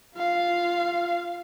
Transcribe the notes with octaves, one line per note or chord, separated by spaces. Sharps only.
F4 F5